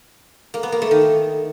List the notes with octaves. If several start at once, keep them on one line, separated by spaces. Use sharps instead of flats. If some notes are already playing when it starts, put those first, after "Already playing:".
A#3
B3
A#3
A3
D#3